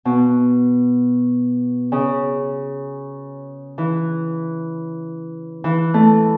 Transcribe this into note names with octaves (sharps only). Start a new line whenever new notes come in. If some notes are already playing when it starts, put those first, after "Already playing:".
B2
C#3
E3
E3
A3